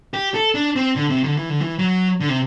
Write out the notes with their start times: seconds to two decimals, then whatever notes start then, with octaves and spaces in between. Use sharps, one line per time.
0.14 G4
0.34 A4
0.55 D4
0.76 C4
0.96 D3
1.10 C3
1.24 D3
1.37 E3
1.49 D3
1.61 E3
1.79 F#3
2.20 D3
2.29 C3